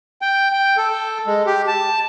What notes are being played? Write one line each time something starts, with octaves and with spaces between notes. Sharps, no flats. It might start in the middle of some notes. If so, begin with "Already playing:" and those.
G5
G5
A4
G#3
G4
A5